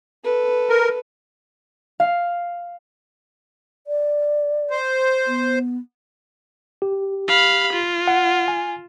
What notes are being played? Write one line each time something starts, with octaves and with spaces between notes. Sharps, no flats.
A4 B4
A#4
F5
D5
C5
B3
G4
F5 B5
F4
F#5
G#5